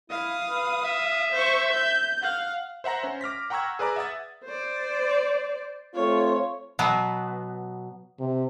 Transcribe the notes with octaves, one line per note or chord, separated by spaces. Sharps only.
E4 F5 D#6
B4
E5
C5 C#6
G6
F5 F#5
C5 E5 F#5 A#5 A#6
C#4 C5
D6 F6 A#6 B6
F#5 G5 A#5 C#6 E6 G#6
G#4 B4 D5 A#5 D6
E5 F#5 D#6 A6
C5 D5
A3 C4 F4 C#5
B2 F#3 B3
C3